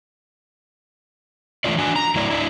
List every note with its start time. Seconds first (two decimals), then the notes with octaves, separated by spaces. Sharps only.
1.64 E3 A3 D4 D#4 F4 D5
1.78 D4 F#4 G#5
1.96 A#5
2.15 F#3 A3 E4 D5
2.31 D4 E4